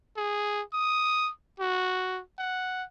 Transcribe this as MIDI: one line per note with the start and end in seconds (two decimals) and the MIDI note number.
0.17 0.61 68
0.73 1.30 87
1.60 2.21 66
2.39 2.84 78